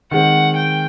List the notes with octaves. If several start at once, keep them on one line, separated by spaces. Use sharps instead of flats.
D#3 G#3 C4 F#5
G5